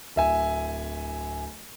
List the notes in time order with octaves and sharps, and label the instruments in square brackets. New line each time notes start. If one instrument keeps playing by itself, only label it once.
[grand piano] D1 E5 G#5